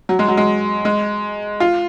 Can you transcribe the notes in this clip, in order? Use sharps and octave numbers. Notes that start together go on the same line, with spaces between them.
F#3
G#3
F#3
G#3
G#3
F4